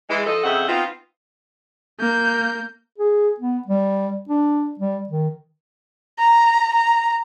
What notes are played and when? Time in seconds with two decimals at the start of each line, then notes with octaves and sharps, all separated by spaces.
0.10 E3 G#3
0.26 F3 A4 D#5
0.44 F2 C#3 C4 D#5 E5 F#5
0.69 B3 C4 D#4 F4
2.00 A#3 G6
2.98 G#4
3.40 B3
3.67 G3
4.29 D4
4.79 G3
5.09 D#3
6.19 A#5
6.74 A#5